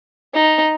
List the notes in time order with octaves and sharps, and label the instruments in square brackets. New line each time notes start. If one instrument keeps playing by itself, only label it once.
[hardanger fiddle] D#4